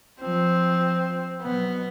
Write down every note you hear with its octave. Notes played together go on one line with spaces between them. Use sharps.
F3 C4
B2 F#3 B3